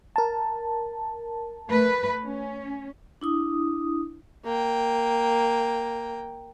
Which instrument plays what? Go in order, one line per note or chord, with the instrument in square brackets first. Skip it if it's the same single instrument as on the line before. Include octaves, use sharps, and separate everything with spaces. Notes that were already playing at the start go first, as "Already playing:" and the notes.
[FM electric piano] A#4 A5
[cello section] A3 B4
C#4
[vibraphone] D4 E4 D#6
[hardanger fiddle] A#3 G5